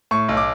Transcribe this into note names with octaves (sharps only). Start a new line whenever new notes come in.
A2 C#6
B1
D6